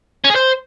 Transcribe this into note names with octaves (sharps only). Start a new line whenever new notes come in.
C#4
G#4
C5